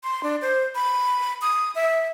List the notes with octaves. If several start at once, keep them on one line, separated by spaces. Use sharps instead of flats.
C6
D4
C5
B5
D#6
E5